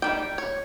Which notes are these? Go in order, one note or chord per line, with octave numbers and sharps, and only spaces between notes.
D#3 G3 G5
C#5